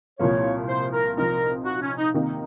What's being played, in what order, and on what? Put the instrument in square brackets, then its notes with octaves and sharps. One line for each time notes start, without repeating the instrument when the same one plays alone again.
[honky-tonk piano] C2 A#2 F3 A#3 [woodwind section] C#5
[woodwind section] C5
A#4
[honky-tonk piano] C3 F3 C4 D#4 [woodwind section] A#4
[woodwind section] F#4
C#4
D#4
[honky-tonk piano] C3 D#3 A#3 D#4